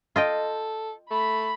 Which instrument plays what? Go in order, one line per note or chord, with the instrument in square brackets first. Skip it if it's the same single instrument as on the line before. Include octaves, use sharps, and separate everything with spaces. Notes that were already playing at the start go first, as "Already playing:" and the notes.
[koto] F4 D#5 G5 [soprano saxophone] A4
[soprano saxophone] A3 [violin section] B5